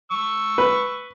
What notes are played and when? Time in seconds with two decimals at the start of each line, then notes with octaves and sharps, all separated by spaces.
0.11 C#6 E6
0.58 B4